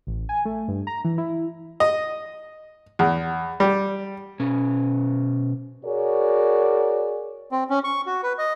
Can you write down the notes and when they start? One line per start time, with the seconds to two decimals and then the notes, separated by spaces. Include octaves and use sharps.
0.07 A1
0.29 G#5
0.45 A3
0.68 G2
0.87 A#5
1.04 E3
1.18 E4
1.80 D#5
2.99 E2
3.60 G3
4.40 B2 C#4
5.85 F#4 G#4 A#4 C#5 D5
7.51 C4
7.70 C#4
7.84 C#6
8.06 F#4
8.23 B4
8.38 D#5